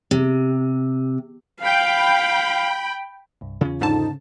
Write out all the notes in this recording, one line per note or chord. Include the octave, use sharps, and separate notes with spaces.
C3
F5 G5 B5
C2 G2
E2 C#3 C#4 F4
G#2 D3 D#4 A5